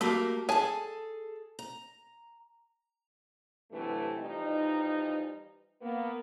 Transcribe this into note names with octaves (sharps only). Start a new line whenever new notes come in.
A3 A#3 F#4 G4 A#4
G#4 A4 G#5 A5
A#5
G2 C3 E3 F#3 A3
E3 F3 G3 D#4
A#3 B3